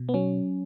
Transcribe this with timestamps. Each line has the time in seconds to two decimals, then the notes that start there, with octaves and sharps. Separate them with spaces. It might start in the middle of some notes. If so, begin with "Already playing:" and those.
Already playing: B2
0.09 B3
0.14 F#3 C#4